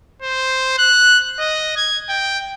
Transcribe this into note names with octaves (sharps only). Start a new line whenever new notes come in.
C5
F#6
D#5
G#6
G5